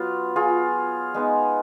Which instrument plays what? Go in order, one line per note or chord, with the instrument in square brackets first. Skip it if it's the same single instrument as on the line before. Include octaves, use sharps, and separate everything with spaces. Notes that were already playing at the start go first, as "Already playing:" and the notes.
Already playing: [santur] F#3 B3 F4
F4 G#4
G#3 B3 D#4